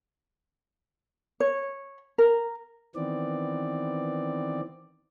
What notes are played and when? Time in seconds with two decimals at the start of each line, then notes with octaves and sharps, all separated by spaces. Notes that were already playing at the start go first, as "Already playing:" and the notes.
1.40 C#5
2.18 A#4
2.96 D#3 E3 B3 C4 D5